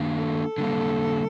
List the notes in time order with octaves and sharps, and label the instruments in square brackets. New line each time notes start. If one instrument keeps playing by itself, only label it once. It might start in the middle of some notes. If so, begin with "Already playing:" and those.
Already playing: [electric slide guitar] D#3 A#3 D4
[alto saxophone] A4
[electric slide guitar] D3 G3 A#3